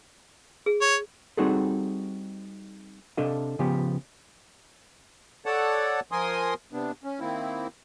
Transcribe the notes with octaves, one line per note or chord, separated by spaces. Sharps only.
G#4
C#5
G3 C4 D#4 F#4 G#4 A4
C3 D4 A4 D#5 F5
C#3 F3 B3 G4
A4 C#5 D5 F#5 A5
F3 A#4 G#5 C6 D#6
C3 B3 D4
C#4
D#3 A#3 C4 E4